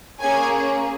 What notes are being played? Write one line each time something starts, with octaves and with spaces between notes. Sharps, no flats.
A#3 C#4 G#4 G#5